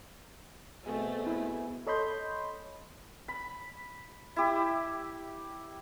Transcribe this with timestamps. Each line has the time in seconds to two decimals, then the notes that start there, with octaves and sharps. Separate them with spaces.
0.86 B2 A3 C4 G#4 G#5
1.27 E4
1.87 A4 C#5 D#5 B5 C6 G6
3.28 B5
4.36 E4 G4